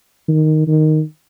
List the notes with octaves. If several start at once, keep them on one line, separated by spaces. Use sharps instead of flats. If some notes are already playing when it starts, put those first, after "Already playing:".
D#3
D#3